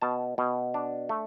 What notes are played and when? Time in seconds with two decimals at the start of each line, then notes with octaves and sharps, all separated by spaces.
0.02 B2 A5
0.38 B2
0.74 D4
1.09 A3